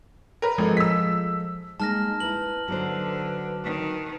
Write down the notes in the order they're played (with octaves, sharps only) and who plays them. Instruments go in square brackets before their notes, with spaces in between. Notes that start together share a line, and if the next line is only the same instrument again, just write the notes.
[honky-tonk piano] A#4 B4
[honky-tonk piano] G#1 [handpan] F3 G#3 A4
[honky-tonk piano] E6 B6
[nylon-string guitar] G#3 A#3 [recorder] D#4 [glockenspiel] A5 F6 A#6
[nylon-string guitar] E4 A#4 [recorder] B4 [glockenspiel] F#7
[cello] D3 [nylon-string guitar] F#3 D#4 C5
[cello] D#3